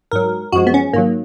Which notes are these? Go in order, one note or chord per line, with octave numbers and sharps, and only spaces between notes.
G#2 F#3 A#4
F#2 F3 G#3 F#4
B3
C#4
G#2 D#3 F#3 A#3